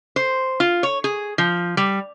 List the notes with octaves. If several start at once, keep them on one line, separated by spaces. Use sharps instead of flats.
C5
F4
C#5
G#4
F3
G3